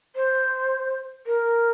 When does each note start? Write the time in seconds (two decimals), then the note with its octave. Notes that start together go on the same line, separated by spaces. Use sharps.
0.16 C5
1.26 A#4